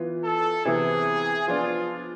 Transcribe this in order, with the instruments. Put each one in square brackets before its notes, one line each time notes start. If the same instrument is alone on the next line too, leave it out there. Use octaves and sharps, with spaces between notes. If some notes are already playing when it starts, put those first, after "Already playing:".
Already playing: [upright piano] E3 B3 F4
[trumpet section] A4
[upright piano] C3 E3 B3 E4 [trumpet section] G#4
[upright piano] F3 B3 D4 [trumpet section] F4